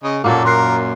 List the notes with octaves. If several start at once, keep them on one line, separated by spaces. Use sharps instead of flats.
C#3 D#5
F#2 A#2 F#3 A#3 F#4 A4
A#4 C6 F#6 C7